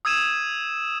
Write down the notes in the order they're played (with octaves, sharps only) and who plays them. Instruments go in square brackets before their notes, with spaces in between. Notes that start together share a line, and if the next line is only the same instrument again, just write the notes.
[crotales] D#6 E6 G#6 D#7 E7